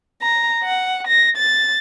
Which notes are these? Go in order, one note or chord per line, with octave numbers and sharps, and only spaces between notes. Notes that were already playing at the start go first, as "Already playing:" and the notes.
A#5
F#5
A#6
A6